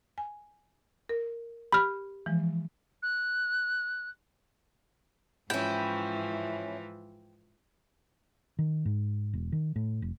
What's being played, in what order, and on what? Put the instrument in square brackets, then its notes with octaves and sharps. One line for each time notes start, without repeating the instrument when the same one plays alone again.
[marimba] G#5
A#4
[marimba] G4 [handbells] B5 F6
[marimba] E3 F3 G#3
[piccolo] F#6
[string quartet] G#2 E3 F3 [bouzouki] C#4 E4 [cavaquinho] G5
[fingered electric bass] D#3
G#2
E1
D#3
A2
F1